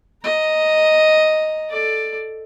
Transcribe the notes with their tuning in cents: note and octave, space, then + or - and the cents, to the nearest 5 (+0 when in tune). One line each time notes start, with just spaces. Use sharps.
D#5 +0 A#5 +0
A4 +0 D5 +10